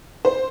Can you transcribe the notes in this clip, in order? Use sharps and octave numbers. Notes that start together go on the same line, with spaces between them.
C5